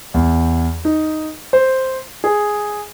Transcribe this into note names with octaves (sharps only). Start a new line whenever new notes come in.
E2
D#4
C5
G#4